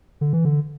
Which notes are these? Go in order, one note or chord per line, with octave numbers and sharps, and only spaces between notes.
D3
E3
D3